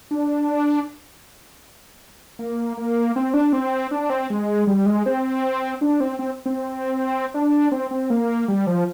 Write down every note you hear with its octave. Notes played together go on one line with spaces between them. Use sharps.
D4
A#3
A#3
C4
D4
C4
D4
C4
G#3
G3
G#3
C4
D4
C4
C4
C4
D4
C4
C4
A#3
G3
F3